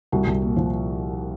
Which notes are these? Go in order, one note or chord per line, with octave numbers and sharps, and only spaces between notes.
C2 F#4
C2
A#2
F3